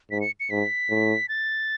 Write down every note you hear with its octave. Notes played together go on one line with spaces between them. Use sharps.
G#2 B6
C#7
C#7
G#2 B6
A2
A6